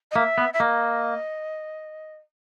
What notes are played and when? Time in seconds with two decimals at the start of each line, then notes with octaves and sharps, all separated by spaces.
0.11 D#5
0.16 A#3 E5
0.38 B3
0.53 E5
0.60 A#3 D#5